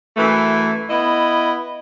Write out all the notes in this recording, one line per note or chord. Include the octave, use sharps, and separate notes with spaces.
F#2 E3 A3
B3 E4 D#5